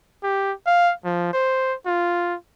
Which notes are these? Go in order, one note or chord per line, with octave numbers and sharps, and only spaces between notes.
G4
F5
F3
C5
F4